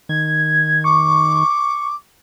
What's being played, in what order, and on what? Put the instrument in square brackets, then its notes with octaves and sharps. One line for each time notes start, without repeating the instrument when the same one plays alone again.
[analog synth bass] D#3 [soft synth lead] G#6
[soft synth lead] C#6 [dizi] D6